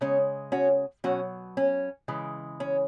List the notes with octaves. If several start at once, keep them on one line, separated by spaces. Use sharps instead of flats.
C#3 G#3 C#4
C#4 F#4
B2 F#3 C#4 F#4
C#4
C#3 E3 G#3
C#4